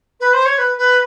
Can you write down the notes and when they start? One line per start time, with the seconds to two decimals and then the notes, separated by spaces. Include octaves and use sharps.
0.20 B4
0.33 C5
0.45 C#5
0.57 B4
0.77 B4